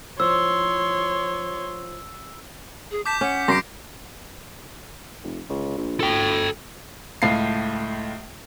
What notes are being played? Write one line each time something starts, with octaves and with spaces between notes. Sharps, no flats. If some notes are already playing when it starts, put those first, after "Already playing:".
F3 E4 C5 C#5 C6 E6
G#4
A5 D6 G6 B6
C#4 F#5
F#2 A#6 C7 D7
F1
C#2
A#1
D2 A4 G5
C#2 A2 F5 C7